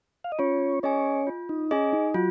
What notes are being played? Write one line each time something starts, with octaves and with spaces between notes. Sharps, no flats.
F5
D#5
C#4 F4 C#5
C#4 G#4 C#5 D#5 G#5
F4
D#4
C#4 G#4 D#5 G#5
D#4
F#3 F4 F#4